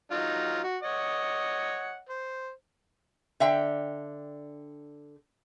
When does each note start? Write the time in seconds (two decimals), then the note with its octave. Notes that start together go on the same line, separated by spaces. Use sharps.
0.11 F#3 D#4 F4
0.64 F#4
0.83 C#5 D#5 F#5
2.09 C5
3.40 D3 E5 G5